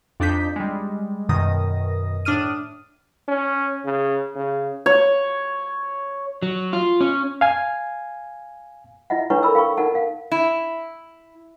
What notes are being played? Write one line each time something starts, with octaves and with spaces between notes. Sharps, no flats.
F2 D4 D#4 G6 B6
G3 G#3
F#2 B2 D#3 D#6 A#6
A2 D4 D#6 F6 D#7
C#4
C#3
C#3
C#5
F#3
F4
C#4
F5 G#5
E4 D#5 E5 F#5
D4 E4 B4 C#5 F#5 C#6
A4 A#4 B5 E6
F5 G5 B5 C#6
D#4 A#4 F#5 A5
A#4 F5 F#5
E4